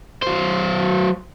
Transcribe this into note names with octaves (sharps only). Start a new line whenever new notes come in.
F#3 C5